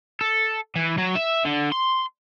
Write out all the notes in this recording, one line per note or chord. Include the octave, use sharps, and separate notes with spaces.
A4
E3
F#3
E5
D3
C6